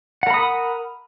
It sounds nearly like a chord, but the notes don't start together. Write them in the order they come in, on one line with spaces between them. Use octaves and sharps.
F#5 A#4 B5 D#6